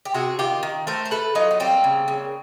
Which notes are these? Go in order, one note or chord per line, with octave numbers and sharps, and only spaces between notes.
G4
C3 F#4 G#4
D#3 F4 G4
D#3
A3 A#4 C5
C5
A3 A4 B4
F#3 D#4 F4
B3
G3 A#3 C4
C#3
C#3